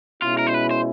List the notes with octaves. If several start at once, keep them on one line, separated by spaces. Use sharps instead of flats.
B2 G#3 C#4 E4 F4
A#4
C5
B4
C5